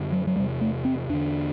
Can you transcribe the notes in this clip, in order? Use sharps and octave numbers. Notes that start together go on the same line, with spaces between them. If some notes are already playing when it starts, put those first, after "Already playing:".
Already playing: F#2 D3
F#3
F#3
E2 C3 G3
A3
C4
E2 D3 D4